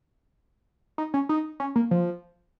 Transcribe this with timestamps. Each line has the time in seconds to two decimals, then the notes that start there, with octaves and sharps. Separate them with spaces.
0.98 D#4
1.14 C#4
1.29 D#4
1.60 C#4
1.76 A#3
1.91 F3